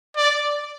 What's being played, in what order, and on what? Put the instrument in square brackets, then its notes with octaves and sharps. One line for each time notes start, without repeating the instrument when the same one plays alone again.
[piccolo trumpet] D5